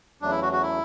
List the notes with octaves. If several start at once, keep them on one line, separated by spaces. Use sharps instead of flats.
E2 C#3 F#3 A3 D4
E4
F#4
F#4
E4